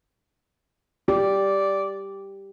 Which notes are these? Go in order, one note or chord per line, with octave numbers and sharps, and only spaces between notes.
G4 D5